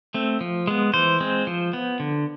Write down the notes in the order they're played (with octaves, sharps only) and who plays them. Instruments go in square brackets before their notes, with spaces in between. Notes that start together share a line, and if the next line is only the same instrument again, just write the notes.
[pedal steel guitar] A3 C4
F3
G#3 B3
E3 C5
G#3 C4
F3
B3
D3